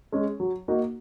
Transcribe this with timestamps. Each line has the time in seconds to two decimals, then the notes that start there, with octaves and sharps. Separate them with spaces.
0.12 G#3 C#4
0.40 F#3
0.68 A#3 D#4 F#4